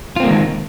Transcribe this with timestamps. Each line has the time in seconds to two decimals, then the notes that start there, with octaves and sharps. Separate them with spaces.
0.16 F4
0.20 C4
0.23 A#3
0.27 G#3
0.30 D#3